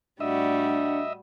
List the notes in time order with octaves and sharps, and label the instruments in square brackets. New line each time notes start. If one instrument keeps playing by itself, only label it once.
[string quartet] A2 G3 F#4 [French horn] D4 [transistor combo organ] D#5 E5